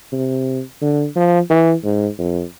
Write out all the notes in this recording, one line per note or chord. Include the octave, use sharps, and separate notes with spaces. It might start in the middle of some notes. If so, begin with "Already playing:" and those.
C3
D3
F3
E3
G#2
F2